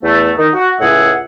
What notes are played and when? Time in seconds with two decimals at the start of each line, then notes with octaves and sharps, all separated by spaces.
0.03 E2 A3
0.38 D#3 D#4
0.54 F#4
0.80 C#2 A2 G#4 E5 F#5